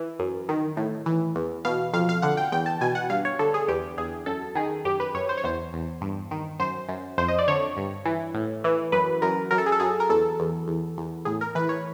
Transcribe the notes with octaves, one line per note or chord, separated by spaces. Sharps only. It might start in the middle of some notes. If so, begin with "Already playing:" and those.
Already playing: E3
F#2
D#3
A2
E3
E2
B2 F5
F2 F5
F5
D3 F#5
G5
E2 G5
A5
B2 G#5
F#5
G2 F5
C#5
D3 A4
G#4
E2 G4
E2 G#4
F#2 A4
D#3 G#4
F#2 G4
B4
F#2 C#5
C5
C#5
E2 C5
E2
G2
D#3
F#2 C5
F#2
F2 C5
D#5
D5
D3 C#5
G2
E3
A2
E3
F#2 B4
F#2 A#4
F#2 A#4
A4
G#4
A4
F#2 G#4
A#4
E2 A4
E2
E2
E2
A2 G#4
A#4
E3 B4
C#5